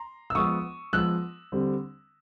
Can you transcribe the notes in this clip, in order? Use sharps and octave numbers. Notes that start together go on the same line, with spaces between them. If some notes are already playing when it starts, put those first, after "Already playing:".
Already playing: A#5 C6
E6
F3 G#3 B3 C#6 D#6
F3 G#3 B3 E6 F#6
D3 G3 C4